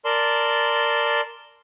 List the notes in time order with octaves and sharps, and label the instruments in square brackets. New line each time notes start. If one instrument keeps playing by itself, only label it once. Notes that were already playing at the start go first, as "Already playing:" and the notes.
[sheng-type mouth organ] A#4 D5 A5 C6